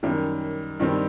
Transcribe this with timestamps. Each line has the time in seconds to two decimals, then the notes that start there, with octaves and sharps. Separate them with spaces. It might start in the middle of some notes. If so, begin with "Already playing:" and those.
0.03 F#2 D#3 G3
0.80 G2 D#3 G3 C4